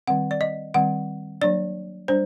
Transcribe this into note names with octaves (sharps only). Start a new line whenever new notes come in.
D#3 G3 C4 F#5
D5
D#5
D#3 G3 C4 F#5
F#3 A#3 D4 D5
G3 D4 C5